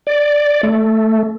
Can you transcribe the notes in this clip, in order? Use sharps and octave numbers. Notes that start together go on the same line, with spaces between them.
D5
A3